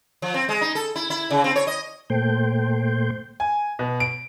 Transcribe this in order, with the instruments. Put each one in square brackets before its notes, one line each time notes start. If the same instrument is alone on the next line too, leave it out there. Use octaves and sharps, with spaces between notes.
[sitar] F3
C4
G#3
D#4
A4
E4
E4
C#3
C4
C#5
D#5
[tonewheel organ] A#2 A3 C5 G5
[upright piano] G#5
B2
D7